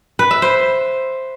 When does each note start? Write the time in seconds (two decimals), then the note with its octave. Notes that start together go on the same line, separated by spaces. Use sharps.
0.19 B4
0.31 E5
0.42 C5